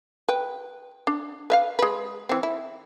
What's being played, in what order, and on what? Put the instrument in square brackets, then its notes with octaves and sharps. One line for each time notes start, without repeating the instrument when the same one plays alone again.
[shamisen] B4 G5
D4
B4 E5 F5
G#3 B4
E3 C4
E4